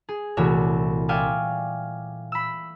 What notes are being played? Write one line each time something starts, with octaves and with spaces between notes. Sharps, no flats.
G#4
C2 A#2 E3 A3 F#4 C#5
D5 E5 F5 G5 G#5 C#6
B5 E6